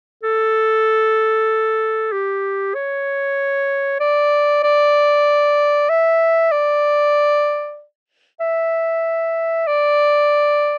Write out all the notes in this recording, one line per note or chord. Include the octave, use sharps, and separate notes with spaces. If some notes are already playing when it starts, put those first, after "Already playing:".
A4
G4
C#5
D5
D5
E5
D5
E5
D5